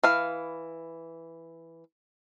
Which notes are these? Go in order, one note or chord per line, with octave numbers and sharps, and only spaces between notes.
E3 F5